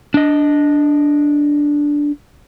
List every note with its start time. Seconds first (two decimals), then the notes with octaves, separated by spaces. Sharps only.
0.14 D4 D#5